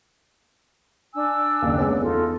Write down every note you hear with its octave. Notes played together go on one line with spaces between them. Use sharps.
D4 G#5 E6
F#1 D#2
G#3 B3 C#5
E2 D#4 F4 A4